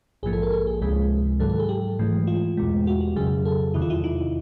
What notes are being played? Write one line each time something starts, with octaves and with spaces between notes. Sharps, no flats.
A#1 G#2 F3 A#3 G#4
A4
A#4
A4
G#4
C#2 C3 F3 G#3 G#4
G#2 D#3 F#3 A4
A4
G#4
G4
G#2 E3 A3
F4
E2 B2 G#3
F#4
G4
F2 C#3 F#3 G#4
A4
E2 C3 D#3 E4
F4
E4
D#4